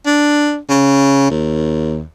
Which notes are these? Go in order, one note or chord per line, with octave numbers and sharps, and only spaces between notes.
D4
C#3
D#2